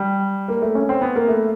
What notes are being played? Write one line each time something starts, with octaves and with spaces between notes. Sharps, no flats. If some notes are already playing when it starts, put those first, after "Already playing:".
Already playing: G3
A#3
A3
C#4
C4
B3
A#3
A3